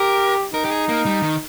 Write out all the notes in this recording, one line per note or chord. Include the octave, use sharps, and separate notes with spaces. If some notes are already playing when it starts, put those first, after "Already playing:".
Already playing: G4 A#4
D#4 A#4
G4
G#4
A#3
G3
D#3